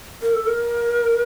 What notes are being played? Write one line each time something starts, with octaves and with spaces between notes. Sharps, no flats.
A#4
A4
A#4